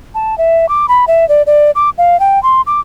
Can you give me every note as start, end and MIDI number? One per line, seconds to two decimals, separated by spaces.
0.15 0.37 81
0.38 0.68 76
0.69 0.86 86
0.88 1.05 83
1.08 1.27 76
1.29 1.42 74
1.47 1.71 74
1.75 1.90 86
1.98 2.19 77
2.20 2.42 79
2.43 2.61 84
2.67 2.80 86